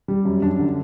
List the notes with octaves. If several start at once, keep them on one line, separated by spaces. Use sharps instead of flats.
G3
F#2
F#2 D4
D3